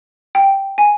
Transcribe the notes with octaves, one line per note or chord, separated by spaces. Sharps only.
G5
G#5